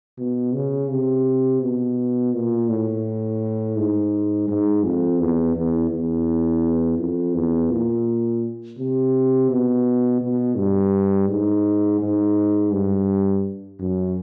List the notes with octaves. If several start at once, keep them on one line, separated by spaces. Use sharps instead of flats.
B2
C#3
C3
B2
A#2
A2
G#2
G#2
F2
E2
E2
E2
F2
E2
A#2
C3
B2
B2
G2
G#2
G#2
G2
F#2